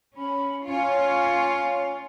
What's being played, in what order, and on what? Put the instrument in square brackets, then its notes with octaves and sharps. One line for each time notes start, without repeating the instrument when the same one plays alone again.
[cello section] C#4 [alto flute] B5
[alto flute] C#4 [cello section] F4 C#5